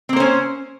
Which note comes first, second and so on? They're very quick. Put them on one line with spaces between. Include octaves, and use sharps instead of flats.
C4 A#3 C5 C#4